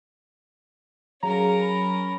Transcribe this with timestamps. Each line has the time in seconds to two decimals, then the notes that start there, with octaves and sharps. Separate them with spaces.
1.23 F#3 C#4 G#4 A#4 F5 A#5
1.61 B5